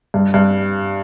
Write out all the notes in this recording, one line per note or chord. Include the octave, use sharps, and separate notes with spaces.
G2
G2